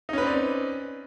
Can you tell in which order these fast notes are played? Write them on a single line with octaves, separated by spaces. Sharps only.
D#4 C#4 B4 C4 D5